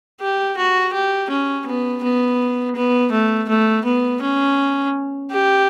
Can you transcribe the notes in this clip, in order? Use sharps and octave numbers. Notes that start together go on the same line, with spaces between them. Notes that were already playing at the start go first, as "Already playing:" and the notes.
G4
F#4
G4
C#4
B3
B3
B3
A3
A3
B3
C#4
G4